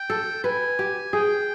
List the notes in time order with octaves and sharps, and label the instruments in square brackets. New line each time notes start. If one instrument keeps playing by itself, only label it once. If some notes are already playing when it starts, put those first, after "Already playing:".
Already playing: [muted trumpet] G5
[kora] A4
[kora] B4 [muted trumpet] G#5
[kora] G4
[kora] G#4 [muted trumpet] G5